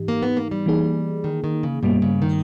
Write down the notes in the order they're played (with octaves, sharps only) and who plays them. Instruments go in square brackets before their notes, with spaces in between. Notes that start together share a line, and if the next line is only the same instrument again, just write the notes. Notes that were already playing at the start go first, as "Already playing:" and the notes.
Already playing: [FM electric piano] G#2 E3 D#4 G4
[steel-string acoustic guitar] A#3
B3
A#3
G3
[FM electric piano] E3 A#3 D#4 G#4
[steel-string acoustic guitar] D#3
D#3
C#3
[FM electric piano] G2 G3 A#3 [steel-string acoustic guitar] B2
[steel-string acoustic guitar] C#3
D#3